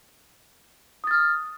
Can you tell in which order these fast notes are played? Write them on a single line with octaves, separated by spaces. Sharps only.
D#6 A6 F6